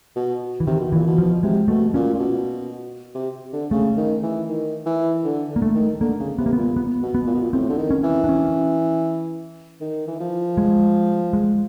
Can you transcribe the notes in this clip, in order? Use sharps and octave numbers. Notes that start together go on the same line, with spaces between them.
B2
E3
C3 D#3
B2
A#2 E3
B2
F3
C3 G#3
B2 A3
A#2 C#4
A#2
B2
C3
D3
C#3 A3
D#3
E3
D#3
E3
D3
D3
A#3
A3
D#3
D3 A#3
C#3
C3 B3
A#3
A#2 B3
B3
B2
B3
A#2
B2
A#2
A2 C4
D3
D#3
C#4
E3
D4
C#4
D#3
E3
F3
G#3
G#3